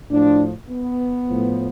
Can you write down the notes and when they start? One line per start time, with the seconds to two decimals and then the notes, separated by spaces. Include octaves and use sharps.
0.11 A2 F3 D4
0.69 B3
1.28 A2 F3